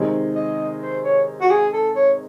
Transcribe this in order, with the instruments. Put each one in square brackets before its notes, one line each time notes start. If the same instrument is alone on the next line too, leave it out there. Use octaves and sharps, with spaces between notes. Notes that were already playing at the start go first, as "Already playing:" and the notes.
Already playing: [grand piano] C3 D#3 G#3
[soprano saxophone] D#5
C5
C#5
F#4
G#4
A4
C#5